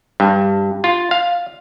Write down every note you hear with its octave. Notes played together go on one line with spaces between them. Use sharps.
G2
F4
F5